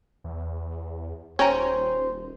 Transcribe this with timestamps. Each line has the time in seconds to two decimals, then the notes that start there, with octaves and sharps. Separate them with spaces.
0.24 E2
1.39 D#1 C#4 C5 C#5 G5 A#5